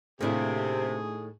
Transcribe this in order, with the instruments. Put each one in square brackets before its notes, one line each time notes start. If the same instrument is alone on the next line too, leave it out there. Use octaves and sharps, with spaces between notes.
[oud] A2 D#3 A#3 [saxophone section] C3 [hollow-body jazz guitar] A3 D4 E4 [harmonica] G#4